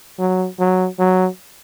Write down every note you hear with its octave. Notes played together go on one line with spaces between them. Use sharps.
F#3
F#3
F#3